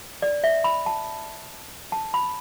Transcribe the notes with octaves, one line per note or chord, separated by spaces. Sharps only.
D5
E5
B5
A5
A5
B5